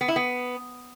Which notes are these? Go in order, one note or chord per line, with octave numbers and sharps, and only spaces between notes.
B3
E4
B3